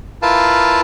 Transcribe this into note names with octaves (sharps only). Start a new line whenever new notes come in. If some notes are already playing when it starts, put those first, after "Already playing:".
E4 F4 A#4 B4 F5 A5